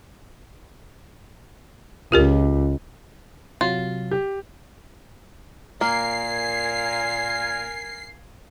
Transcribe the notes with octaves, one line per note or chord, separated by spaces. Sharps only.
C#2 F4 G4 A#4
C3 F#3 F4
G4
A#2 A#3 A#4 G#5 C7